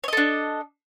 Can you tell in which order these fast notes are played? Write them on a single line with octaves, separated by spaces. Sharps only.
C#5 D#5 A4 D4